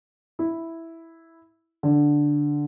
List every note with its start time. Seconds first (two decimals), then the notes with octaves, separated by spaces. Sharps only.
0.39 E4
1.83 D3